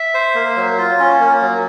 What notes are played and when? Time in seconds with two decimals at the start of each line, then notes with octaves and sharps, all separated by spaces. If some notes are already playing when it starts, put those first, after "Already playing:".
Already playing: E5
0.14 C5
0.35 A#3
0.56 F#3
0.78 F4
0.99 C#4
1.20 A#3
1.42 F#3